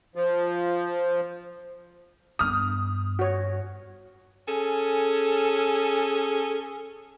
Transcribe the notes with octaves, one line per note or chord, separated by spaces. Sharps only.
F3
G2 B3 D#6 F6
F#4 C#5
C#4 G#4 A4